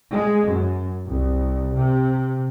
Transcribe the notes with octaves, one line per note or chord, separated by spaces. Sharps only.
G#3
F#2
C2
C3